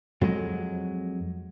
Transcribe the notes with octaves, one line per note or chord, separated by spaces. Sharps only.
F2 F#3 G#3